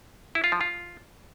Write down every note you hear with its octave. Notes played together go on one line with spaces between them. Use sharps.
E4
F4
F3
F4